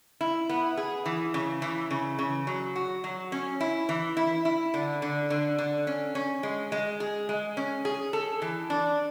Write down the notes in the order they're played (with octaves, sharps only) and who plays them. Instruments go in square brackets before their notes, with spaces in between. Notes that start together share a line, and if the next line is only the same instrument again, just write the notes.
[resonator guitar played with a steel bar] E4
B3
G#4
E3
C#3
E3
C#3
C#3
F#3
F#4
F#3
C#4
E4
E3
E4
E4
D3
D3
D3
D3
C#4
C#4
G#3
G#3
G#4
G#3
C#4
G#4
A4
E3
D4